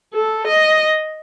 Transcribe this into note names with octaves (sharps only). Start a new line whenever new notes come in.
A4
D#5